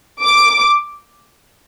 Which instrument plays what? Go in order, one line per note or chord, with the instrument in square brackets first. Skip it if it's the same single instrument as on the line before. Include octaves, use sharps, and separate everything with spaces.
[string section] D6